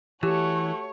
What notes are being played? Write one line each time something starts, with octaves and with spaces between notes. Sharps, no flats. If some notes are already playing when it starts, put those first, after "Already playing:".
E3 A3 F#4 G4 C#5